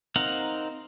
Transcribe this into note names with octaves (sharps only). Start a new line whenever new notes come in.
C4 D#4 A#4 F5 F#5